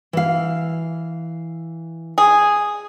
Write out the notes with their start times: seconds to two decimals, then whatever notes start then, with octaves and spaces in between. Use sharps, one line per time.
0.13 E3 F5
2.18 G#4